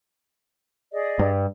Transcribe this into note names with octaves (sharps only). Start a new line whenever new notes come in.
G#4 D5 D#5
G2